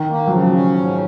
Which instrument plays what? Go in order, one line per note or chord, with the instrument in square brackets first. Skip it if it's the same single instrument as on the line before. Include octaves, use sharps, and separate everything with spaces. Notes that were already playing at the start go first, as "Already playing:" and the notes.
Already playing: [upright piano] D#3
[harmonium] A#3
[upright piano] F#3
[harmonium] C#3 [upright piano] F3
[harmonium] C#4
G#2